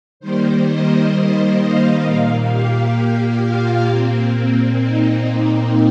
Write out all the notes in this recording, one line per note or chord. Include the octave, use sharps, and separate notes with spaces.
D#3 G3 A#3 C5
D#5
F5
A#2 A#3 F5
G4
G4
F4
A#2 A#3 C4
C4
D#4
C4